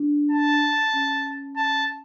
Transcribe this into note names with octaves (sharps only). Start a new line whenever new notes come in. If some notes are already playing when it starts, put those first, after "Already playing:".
Already playing: D4
A5
C#4
A5